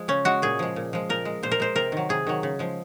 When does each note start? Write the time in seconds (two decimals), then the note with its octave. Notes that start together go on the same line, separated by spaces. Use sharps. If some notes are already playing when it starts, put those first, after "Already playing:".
Already playing: F3 G#3
0.08 C#3 C#4
0.25 G#3 F#4
0.42 A#2 G#4
0.59 F3 G#3
0.76 A#2
0.93 F3 G#3
1.09 A#2 A#4
1.25 G#3
1.43 A#2 C5
1.51 A#4
1.60 G#3 C5
1.76 C3 A#4
1.92 D#3 F#3
2.09 C3 G#4
2.27 D#3 F#3
2.43 C#3
2.59 F3 G#3